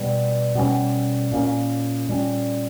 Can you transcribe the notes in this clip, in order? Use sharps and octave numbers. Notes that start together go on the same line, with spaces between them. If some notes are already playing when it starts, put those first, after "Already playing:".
Already playing: B2 G3 B3
B2 G3 C#4
A#2 A#3 C#4
A#2 G3 C#4